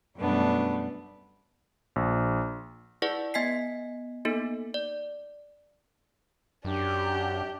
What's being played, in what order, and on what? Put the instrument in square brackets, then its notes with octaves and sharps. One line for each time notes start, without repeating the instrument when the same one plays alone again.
[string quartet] F#2 B2 G3 A3 B3 D4
[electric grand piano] A#1
[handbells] E4 G#4 B4 D5 F#5
B3 D#5 G#5 B6 C7
A#3 B3 D#4 A4
D5
[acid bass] F#2 [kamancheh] D4 G4